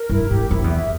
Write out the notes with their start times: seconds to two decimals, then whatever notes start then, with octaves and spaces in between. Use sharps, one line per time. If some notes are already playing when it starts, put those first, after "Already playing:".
Already playing: A#4
0.09 G2 E4
0.30 G#2 G4
0.50 F2 E4
0.64 E2
0.70 E5